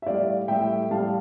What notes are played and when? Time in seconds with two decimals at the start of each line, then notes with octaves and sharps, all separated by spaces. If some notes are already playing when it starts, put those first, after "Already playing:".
0.02 E5
0.06 A2 G3 D5 F5
0.48 A2 G3 E5 G5
0.91 A2 G3 F5 A5